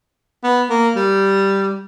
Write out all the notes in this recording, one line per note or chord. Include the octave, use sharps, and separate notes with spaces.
B3
A#3
G3